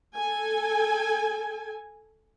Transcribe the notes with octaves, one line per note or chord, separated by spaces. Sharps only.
A4 G#5